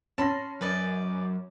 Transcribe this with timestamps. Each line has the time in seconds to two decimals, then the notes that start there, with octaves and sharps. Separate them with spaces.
0.18 C#4 A5 B5 C6 A#6
0.61 F#2 B4 D5 D#5